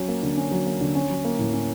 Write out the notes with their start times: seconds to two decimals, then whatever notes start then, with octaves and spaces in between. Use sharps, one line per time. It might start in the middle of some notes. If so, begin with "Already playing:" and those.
Already playing: F#3 C#4
0.08 A#3
0.23 D3
0.38 C#4
0.51 F#3
0.67 A#3
0.81 D3
0.95 C#4
1.09 F#3
1.25 A#3
1.39 A2
1.53 C#4